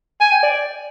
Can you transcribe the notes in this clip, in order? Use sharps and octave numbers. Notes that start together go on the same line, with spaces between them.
G#5
G5
D5